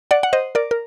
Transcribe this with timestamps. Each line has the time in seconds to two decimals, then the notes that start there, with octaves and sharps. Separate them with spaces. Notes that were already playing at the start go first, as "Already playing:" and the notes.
0.11 D5 F#5
0.23 F#5
0.33 C5 D#5
0.55 A#4 D5
0.71 A#4